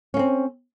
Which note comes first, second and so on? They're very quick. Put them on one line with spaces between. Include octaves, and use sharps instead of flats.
C#4 A#3 C4